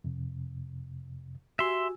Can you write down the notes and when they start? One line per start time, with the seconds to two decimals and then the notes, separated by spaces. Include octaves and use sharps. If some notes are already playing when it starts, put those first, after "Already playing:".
0.04 F2 C3
1.59 F#4 G4 E5 G#5 C6 E6